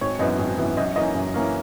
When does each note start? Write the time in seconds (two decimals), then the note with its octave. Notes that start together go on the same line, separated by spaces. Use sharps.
0.01 G#1 C#5
0.19 F#2 E3 B3 D#5
0.38 G#1
0.58 F#2 E3 B3
0.77 F#2 D#5
0.96 E3 A#3 C#4 D#5
1.15 F#2
1.34 E3 A#3 C#4